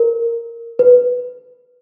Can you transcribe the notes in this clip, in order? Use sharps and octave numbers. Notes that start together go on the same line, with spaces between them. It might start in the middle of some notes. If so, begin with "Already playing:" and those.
Already playing: A#4
B4